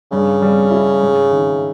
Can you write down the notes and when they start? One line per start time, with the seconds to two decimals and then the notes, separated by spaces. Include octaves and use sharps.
0.11 G2 C#3
0.42 G3
0.71 E4
1.02 G#2
1.31 D#3